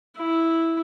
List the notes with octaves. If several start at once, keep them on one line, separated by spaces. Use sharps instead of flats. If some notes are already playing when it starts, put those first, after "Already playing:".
E4